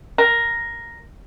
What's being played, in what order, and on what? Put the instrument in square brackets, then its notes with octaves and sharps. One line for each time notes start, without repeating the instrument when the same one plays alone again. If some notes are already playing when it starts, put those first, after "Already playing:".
[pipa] A#4